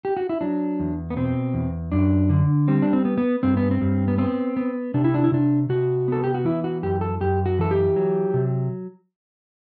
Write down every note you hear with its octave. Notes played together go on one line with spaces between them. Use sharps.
G4
F#4
E4
F#3 D4
E2
B3
B2 C4
E2
F#2 D4
D3
G3 C4
D4
C4
B3
B3
G2 C4
B3
C4
G2
B3
B3 C4
B3
C3 D4
E4
D4
E4
C3 D4
C3 F#4
B3 A4
G4
F#4
E3 E4
F#4
F#2 G4
A4
F#2 G4
F#4
E3 A4
G4
F#3
C3